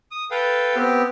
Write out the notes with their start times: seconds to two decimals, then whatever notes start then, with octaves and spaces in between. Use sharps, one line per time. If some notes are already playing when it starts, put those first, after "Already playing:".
0.11 D#6
0.31 A4 B4 F5 G5
0.75 B3 C4 G4